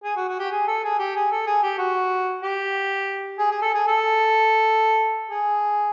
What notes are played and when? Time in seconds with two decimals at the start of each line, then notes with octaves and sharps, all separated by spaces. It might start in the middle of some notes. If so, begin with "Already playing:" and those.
0.03 G#4
0.16 F#4
0.28 F#4
0.39 G4
0.51 G#4
0.67 A4
0.84 G#4
0.99 G4
1.15 G#4
1.31 A4
1.47 G#4
1.63 G4
1.78 F#4
2.43 G4
3.38 G#4
3.51 G#4
3.62 A4
3.74 G#4
3.86 A4
5.30 G#4